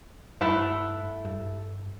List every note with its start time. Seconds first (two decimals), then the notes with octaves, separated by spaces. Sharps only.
0.41 G2 A3 E4 F#5
1.25 G2